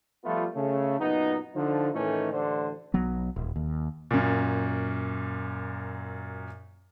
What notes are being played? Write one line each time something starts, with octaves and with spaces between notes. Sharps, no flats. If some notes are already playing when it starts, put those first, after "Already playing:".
F3 G3 A3 B3 F4
C#3 A3
F#2 A#2 B3 D#4
D3 F3 D#4
A2 D#3 E3 A3 C#4 D#4
A1 D3 C5
B1 B2 F#3 B3
D#1
D#2
F#2 A#2